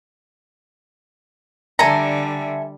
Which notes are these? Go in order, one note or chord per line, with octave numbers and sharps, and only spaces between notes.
D3 G3 A4 E5 G#5 A#5